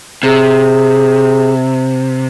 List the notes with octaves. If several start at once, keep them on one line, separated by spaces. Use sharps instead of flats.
C3 G#4